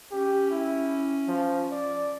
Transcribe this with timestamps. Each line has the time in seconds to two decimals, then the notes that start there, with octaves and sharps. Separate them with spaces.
0.11 C#4 G4
0.51 E4
1.28 F3
1.72 D5